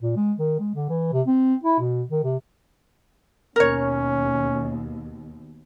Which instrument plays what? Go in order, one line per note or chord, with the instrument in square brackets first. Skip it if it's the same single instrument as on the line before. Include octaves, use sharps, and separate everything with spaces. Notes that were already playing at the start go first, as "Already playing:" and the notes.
[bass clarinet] A#2
G#3
D#3
G#3
D3
E3
C3
C4
E4
B2
D#3
C3
[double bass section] D#2 B2 [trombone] C#4 [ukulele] A#4 C#5